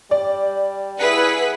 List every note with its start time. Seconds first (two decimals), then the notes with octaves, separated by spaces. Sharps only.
0.11 G3 D5
0.99 E4 G#4 B4 F#5 B6